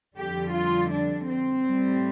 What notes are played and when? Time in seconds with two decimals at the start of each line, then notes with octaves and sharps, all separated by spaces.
0.16 F2 D3 G3 G4
0.52 F4
0.90 D4
1.27 C4
1.64 A2 G3